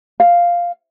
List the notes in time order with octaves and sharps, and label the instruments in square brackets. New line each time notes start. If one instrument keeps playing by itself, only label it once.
[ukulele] F5